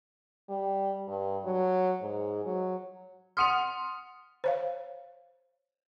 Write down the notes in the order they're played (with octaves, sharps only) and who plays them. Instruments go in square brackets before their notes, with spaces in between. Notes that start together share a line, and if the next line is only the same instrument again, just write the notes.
[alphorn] G3
G2
F#3
G#2
F#3
[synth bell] F#5 D#6 F6 [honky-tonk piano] C6 C#7 F7
[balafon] C5 C#5 F5